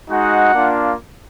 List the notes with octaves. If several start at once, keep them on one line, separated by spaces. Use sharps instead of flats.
G#3 D#4 F#4 F#5
A#3 D4 F4